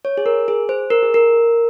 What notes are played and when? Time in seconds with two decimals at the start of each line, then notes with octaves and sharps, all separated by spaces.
0.05 C#5
0.18 G#4
0.26 A#4
0.48 G#4
0.69 C5
0.90 A#4
1.03 G#4
1.14 A#4